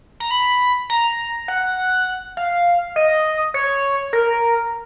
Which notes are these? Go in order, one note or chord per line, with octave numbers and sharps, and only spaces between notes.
A#5
B5
A#5
F#5
F5
D#5
C#5
A#4